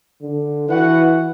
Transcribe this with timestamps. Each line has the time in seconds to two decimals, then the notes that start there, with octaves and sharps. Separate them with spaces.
0.22 D3
0.69 E3 F#4 B4 F#5